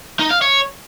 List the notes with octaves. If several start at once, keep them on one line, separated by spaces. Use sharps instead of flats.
D#4
F5
C#5